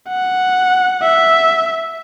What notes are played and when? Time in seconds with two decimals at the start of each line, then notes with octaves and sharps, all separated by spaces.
0.09 F#5
1.02 E5